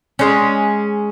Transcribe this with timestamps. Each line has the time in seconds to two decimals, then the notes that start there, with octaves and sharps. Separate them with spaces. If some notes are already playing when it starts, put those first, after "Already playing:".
0.19 G#3 C#4